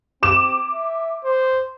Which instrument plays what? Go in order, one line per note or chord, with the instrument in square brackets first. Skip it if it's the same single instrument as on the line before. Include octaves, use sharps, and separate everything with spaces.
[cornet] C4 [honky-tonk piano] D6 E7
[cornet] E5
C5